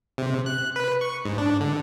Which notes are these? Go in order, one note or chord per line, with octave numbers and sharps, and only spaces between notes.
C3
F#6
B4
C#6
G#2
D4
D3